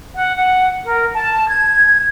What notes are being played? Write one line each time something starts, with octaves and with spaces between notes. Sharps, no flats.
F#5
F#5
A#4
A5
G#6